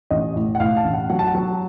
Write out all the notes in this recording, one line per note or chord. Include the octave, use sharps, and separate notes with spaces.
A1 D#5
A2
F#5
A2 F5
A5
A1
F#5
F#3 F#5
A5
F#5
F#3